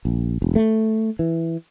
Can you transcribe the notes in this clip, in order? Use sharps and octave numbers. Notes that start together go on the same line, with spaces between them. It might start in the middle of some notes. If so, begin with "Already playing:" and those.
A#1
E1
A3
E3